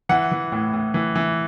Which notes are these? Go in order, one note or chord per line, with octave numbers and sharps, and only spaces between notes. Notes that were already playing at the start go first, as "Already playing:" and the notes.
E3 F#5
E3
A2
A2
E3
E3